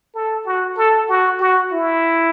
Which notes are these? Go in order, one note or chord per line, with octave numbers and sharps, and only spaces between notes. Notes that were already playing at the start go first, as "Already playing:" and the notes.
A4
F#4
A4
F#4
F#4
E4